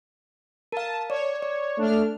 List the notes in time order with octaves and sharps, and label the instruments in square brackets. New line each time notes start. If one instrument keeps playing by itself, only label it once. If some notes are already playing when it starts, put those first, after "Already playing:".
[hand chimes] A#4 F5 [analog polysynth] A5
[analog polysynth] C#5 [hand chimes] D5
[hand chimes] D5
[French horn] A3 [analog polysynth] D4 F6